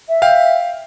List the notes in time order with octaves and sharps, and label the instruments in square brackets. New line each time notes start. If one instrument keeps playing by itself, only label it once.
[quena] E5
[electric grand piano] F5 G5